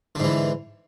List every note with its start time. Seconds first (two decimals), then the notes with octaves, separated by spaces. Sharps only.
0.15 D3
0.20 G#2
0.24 E3